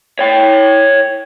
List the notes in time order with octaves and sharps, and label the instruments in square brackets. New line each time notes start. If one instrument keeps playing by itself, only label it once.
[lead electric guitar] C#5 G5